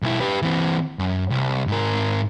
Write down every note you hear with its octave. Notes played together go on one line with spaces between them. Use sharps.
B1 E4
G4 B4
E3 C4
F#2
C2
G#2 A#4